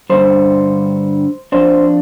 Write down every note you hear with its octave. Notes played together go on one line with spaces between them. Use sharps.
G2 D3 G3 C5
F2 F3 D4 C5